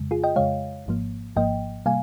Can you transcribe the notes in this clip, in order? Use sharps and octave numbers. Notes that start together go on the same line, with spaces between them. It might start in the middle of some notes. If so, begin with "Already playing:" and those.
Already playing: F2 C#3 G#3
F4 G#4
D#5 G5
F2 C#3 G#3 C#5 F5
G#1 G#2 F3 A#3
G#1 G#2 F3 A#3 D#5 G5
C3 G3 A#3 F5 G#5